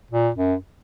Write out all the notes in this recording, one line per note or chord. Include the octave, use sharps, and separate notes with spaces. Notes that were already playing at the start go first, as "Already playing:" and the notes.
A#2
F#2